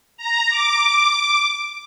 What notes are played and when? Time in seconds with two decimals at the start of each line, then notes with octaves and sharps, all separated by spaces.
0.17 A#5
0.49 D6